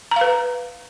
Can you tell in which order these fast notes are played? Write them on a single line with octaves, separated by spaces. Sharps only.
A#5 F5 B4